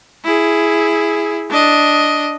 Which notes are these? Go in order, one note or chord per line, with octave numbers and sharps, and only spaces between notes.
E4 G#4
D4 D#5